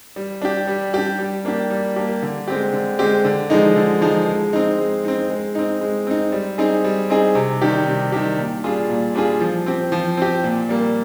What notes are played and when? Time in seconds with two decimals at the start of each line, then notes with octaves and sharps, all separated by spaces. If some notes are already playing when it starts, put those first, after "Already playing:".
0.16 G3
0.42 D4 G4
0.67 G3
0.94 D4 G4
1.19 G3
1.45 A#3 D4 G4
1.70 G3
1.96 A#3 D4 G4
2.22 D3
2.48 G#3 C4 G4
2.73 D3
2.99 G#3 C4 G4
3.25 D3
3.50 F3 G#3 D#4
3.76 D3
4.01 F3 G#3 D#4
4.27 G#3
4.53 C4 D#4
4.78 G#3
5.05 C4 D#4
5.30 G#3
5.55 C4 D#4
5.81 G#3
6.07 C4 D#4
6.32 G3
6.58 C4 D#4 G#4
6.84 G3
7.10 C4 D#4 G#4
7.35 C3
7.61 D#3 G3 D4 G4
7.87 C3
8.12 D#3 G3 D4 G4
8.38 A#2
8.64 G3 D4 F4 G#4
8.90 A#2
9.15 G3 D4 F4 G#4
9.40 F3
9.66 C4 G4
9.92 F3
10.17 C4 G4
10.44 A#2
10.69 G3 A#3